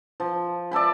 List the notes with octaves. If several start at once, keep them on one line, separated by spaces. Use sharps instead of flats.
F3
D5 E5 A5 B5